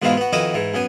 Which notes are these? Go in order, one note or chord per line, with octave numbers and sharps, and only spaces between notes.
G#2 B2 E3 G#3 E4 F4
B3 F#4
F2 D#3 E4 F#4 B4 D#5
G#2 E3
F#2 B3 G#5